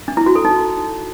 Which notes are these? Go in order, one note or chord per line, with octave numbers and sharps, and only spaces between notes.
D4
E4
F#4
A4
D#4